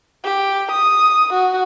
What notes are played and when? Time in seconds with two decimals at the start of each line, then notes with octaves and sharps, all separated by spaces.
0.24 G4
0.71 D#6
1.33 F#4